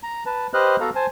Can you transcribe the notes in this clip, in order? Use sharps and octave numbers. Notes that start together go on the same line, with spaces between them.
A#5
B4 A5
G4 B4 C5 D#5 F6 F#6
B3 F#4 A4 F5 A#5
C5 G#5 A5